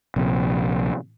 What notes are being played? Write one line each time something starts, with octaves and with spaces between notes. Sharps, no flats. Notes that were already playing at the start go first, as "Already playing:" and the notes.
A#1 C3